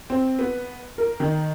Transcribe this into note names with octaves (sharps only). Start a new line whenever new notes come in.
C4
B3
A#4
D#3